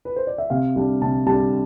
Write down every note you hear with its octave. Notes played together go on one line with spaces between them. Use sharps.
B4
C5
D5
E5
C3 F5
G3 D4
C3 A5
G3 D4 A5